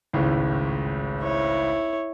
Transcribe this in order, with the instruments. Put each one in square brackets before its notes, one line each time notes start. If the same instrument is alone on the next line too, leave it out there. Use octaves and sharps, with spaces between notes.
[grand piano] G#1 C#2 A2
[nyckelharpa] E4 C#5